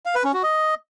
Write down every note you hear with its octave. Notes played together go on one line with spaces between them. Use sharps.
F5
B4
C#4
F#4
D#5